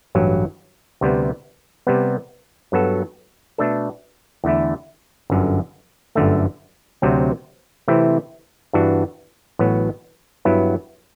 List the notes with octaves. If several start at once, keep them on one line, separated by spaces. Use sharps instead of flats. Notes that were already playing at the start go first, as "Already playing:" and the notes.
A1 G2 F#3
D2 C3 G3 B3
C3 G3 B3
G2 F#3 B3 F#4 A4
B2 A3 D4 A4
E2 D3 A3 E4
G1 F#2 D3
G1 F#2 D3 A3
D2 C3 F#3 C4
C3 E3 A3 C4 E4
G2 E3 B3 D4 F#4
A1 A2 F#3 B3 F#4
G2 F#3 B3 E4